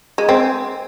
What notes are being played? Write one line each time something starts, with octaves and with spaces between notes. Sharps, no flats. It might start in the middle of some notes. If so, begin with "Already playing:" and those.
G#3
C4